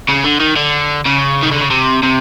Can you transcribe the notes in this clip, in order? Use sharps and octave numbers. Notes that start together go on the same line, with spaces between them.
C#3
D3
D#3
D3
C#3
D#3
D3
C#3
C3
C3